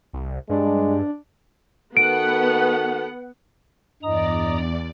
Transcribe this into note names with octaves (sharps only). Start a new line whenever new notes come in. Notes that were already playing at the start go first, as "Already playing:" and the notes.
C2
G2 G#3 D4
D#3 B3 F#4 A4 F#5 D7
E2 G2 D5 D#5 A#5 D#6